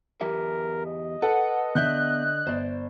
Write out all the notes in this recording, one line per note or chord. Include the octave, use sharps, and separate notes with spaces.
E2 G4 A#4 E5
D#5
A4 B4 F#5
D3 B3 E5 F#6 G6
G1 C5 D5